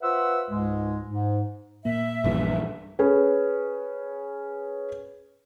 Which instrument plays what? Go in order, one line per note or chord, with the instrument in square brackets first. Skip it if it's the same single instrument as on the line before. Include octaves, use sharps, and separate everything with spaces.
[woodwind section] F4 B4 C5 E5 F#5 E6
C#2 G#2 G#3
G#2
[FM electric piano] A#2 A#3 [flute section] E5
[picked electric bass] A#1 G2 E3
[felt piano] C#4 G#4 B4